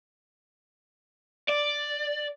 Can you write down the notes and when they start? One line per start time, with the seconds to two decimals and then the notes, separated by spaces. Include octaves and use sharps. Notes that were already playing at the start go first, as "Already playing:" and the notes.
1.48 D5